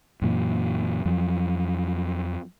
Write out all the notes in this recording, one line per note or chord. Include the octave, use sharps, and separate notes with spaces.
F#2 A#2 E3
F2 F3 F#3